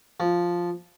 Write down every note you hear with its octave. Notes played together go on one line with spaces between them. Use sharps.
F3